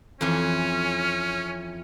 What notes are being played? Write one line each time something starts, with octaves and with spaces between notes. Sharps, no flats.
F2 E3 C#4